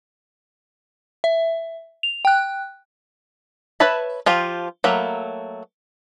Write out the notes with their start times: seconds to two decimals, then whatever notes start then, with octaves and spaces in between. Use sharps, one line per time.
1.24 E5
2.03 F7
2.25 G5 F#6
3.80 B4 C#5 E5 A5 B5
4.26 F3 F4 G4
4.84 F#3 A3 A#3 B5